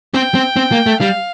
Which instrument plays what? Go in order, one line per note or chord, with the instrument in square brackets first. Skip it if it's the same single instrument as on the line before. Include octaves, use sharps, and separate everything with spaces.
[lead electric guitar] C4 [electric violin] G5
[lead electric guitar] C4
C4
A#3
A3
[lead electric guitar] G3 [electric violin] F5